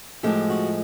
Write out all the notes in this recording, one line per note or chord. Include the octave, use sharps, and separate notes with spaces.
A2 F3 G#3 C4 G4
F#4